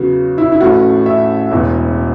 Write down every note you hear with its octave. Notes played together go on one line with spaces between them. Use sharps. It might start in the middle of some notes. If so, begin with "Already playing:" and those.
Already playing: E2 C#3 F#3 B3 F#4
E4
E4
A1 A2 E3 A3 C#4 F#4
E5
E1 E2 E3